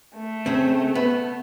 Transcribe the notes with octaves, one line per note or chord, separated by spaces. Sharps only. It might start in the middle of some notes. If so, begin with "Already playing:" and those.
A3
C#3 C4
B3